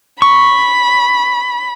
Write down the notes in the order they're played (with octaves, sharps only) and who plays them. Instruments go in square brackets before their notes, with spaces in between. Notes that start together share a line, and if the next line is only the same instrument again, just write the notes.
[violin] B5 [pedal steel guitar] C#6